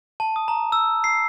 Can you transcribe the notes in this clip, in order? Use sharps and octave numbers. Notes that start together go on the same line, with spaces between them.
A5
D#6
A#5
E6
C7